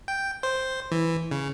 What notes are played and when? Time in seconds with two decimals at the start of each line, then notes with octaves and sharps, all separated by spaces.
0.08 G5
0.43 C5
0.92 E3
1.31 C#3